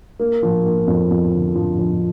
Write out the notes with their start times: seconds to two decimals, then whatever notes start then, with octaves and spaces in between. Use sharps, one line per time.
0.19 A#3
0.42 F3
0.65 A#3
0.87 F2
1.10 F2
1.33 D3
1.55 F3
1.78 F3